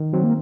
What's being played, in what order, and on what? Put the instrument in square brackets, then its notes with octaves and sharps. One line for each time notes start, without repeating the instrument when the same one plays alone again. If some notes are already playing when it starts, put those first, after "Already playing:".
Already playing: [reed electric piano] D#3
[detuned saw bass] F#3 [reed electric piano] C4
[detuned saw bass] A#3